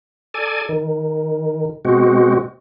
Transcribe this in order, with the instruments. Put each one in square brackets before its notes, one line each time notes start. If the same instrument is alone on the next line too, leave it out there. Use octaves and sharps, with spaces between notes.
[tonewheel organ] A4 D5 G#5
D#3
B2 G#3 C4 F#4